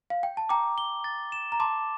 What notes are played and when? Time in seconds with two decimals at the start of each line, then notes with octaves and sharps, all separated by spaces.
0.10 F5
0.23 G5
0.37 A5
0.49 G5 A#5 D6
0.78 G7
1.04 A6
1.32 E7
1.52 A#5
1.60 A5 C6 D6